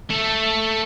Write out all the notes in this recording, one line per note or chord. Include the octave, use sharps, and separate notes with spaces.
A3 A4